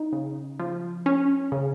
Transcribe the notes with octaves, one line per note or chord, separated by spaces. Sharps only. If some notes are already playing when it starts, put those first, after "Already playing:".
Already playing: D#4
C#3
F3
C#4
C#3